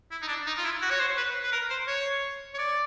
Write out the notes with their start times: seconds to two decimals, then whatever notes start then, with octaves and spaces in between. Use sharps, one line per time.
0.11 E4
0.22 D#4
0.28 D4
0.46 D#4
0.57 F4
0.64 E4
0.82 F#4
0.90 C#5
1.00 C5
1.17 B4
1.43 B4
1.52 A#4
1.70 C5
1.87 C#5
2.54 C#5
2.58 D5